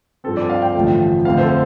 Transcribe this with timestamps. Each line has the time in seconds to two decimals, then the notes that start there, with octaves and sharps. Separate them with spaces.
0.24 G2 F3 C4 A4
0.37 D5
0.50 F5
0.62 G5
0.74 A1 G2 D3 F3 A3
1.25 F2 D3 A3 C4 F5
1.37 C5
1.43 A4